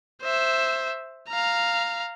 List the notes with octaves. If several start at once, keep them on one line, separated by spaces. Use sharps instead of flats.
C5 E5
F5 A#5